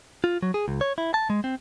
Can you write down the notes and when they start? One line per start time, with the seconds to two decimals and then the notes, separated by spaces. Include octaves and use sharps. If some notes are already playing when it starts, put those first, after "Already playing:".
0.24 F4
0.42 F#3
0.54 G#4
0.68 C#2
0.81 C#5
0.98 E4
1.14 A5
1.30 G#3
1.44 C4